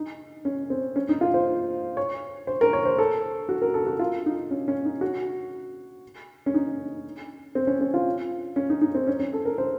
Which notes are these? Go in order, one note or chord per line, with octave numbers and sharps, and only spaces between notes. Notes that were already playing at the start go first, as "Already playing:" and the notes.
Already playing: D#4
C#4
C4
C#4
D#4
F4
C5
C#5
C5
A#4
C#5
C5
A4
F#4
A#4
A4
F#4
F4
D#4
C#4
C#4
D#4
F#4
C#4
D#4
C4
C#4
C#4
F4
C#4
D#4
D#4
C4
C#4
C#4
A4
A#4
C5